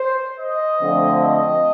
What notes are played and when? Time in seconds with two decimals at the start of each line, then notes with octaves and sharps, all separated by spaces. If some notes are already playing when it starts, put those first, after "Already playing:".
Already playing: C5
0.38 D#5
0.81 D3 F3 A3 C4
1.22 D#5